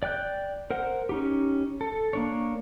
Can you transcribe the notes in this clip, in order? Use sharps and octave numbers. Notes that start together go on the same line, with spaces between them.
D5 G5 F#6 G6
A#4 C5 F#5
C#4 D#4 G4
A4
A#3 D4 C#5